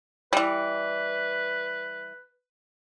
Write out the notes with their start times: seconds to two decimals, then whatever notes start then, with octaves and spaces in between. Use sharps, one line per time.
0.33 E3 G3 B4